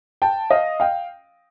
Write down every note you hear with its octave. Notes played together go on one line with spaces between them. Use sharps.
G5 A5
D#5 F5
F5 G5